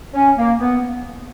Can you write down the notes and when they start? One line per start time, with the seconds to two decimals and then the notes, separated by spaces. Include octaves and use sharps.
0.14 C#4
0.37 A#3
0.59 B3